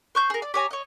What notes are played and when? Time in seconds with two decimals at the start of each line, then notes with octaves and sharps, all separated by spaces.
0.15 C5 C#6 G6
0.30 G#4 A#4
0.42 D5
0.54 G4 C#5 G#5 A#5
0.71 C#5 D#5